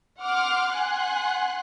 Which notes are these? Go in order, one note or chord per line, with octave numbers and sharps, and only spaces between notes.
F#5 C6 D6 F6
F#5 G#5 C6 F#6